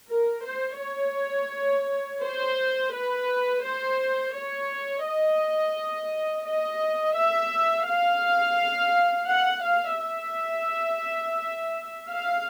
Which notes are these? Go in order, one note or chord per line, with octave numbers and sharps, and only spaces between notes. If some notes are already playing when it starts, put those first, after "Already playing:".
A#4
C5
C#5
C5
B4
C5
C#5
D#5
D#5
E5
F5
F#5
F5
E5
F5